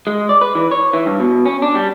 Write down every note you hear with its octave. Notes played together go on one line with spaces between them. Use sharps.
G#3
D5
B4
E3
C#5
E3
G2
B2
C#4
D4
G3